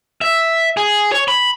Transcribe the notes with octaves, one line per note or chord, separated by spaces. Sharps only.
E5
G#4
C#5
B5